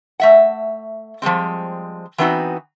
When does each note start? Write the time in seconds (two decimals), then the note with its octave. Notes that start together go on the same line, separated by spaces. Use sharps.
0.20 A3 E5 F#5
1.22 F3 G3 G#3 C4
2.18 E3 F#3 B3 C4 D#4 F#4